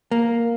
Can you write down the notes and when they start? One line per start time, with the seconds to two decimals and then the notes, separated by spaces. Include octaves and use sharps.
0.11 A#3